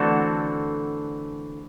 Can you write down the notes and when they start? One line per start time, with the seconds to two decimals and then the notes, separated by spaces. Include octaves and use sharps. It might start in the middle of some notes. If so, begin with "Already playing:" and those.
Already playing: D3 E3 A3 C4 F#4 A4